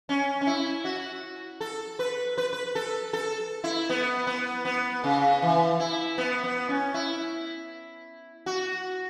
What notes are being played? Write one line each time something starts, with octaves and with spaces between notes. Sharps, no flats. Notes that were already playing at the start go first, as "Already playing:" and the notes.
C#4
C#4
E4
F#4
A4
B4
B4
B4
A4
A4
E4
B3
B3
B3
C#3
E3
E4
B3
B3
C#4
E4
F#4